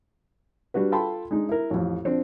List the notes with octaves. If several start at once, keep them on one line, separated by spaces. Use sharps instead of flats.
G3 D4 F#4 B4
F4 A4 G5 A5 B5 C6
G#3 D4 D#4
E4 A#4
A1 F2
F3 C4 D4